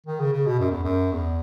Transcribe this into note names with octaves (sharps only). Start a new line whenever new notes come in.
D#3
C#3
C#3
B2
F#2
E2
F#2
E2